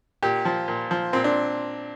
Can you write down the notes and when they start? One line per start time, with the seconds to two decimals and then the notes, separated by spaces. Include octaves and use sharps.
0.23 A#2 G4
0.45 F3
0.68 A#2
0.91 F3
1.13 A#2 C4
1.24 D4